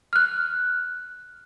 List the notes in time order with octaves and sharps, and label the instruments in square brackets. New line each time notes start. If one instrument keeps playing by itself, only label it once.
[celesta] F6 F#6